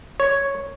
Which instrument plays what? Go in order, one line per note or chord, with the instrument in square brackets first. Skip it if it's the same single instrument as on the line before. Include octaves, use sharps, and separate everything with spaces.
[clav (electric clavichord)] C#5